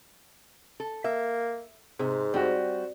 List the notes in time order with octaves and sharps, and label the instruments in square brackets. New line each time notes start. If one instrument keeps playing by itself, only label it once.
[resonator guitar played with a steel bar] A4
[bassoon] A#3 [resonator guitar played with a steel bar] E5
[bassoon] G#2 [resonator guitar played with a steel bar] C3
[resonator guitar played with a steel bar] G3 [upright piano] C4 F#4